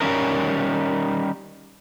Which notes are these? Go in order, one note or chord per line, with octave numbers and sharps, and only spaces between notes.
D#3 G3 C#4 D#4 A#4